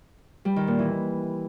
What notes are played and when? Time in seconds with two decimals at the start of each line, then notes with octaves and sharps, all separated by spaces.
0.45 G3
0.56 D#3
0.68 A#2
0.79 E3